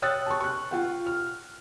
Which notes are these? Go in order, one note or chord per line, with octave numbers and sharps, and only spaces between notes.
C#5 G5 D#6 E6 F#6 A6
A5 C#6
C#6 F#6
F4 F#5 G5
F6